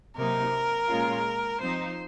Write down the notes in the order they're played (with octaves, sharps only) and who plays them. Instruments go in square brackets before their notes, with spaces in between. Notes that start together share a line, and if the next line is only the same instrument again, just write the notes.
[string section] C3 F#3 A#3 D#4 [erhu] A#4
[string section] A#2 G#3 C#4 F4
[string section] F3 C4 D#4 [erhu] C5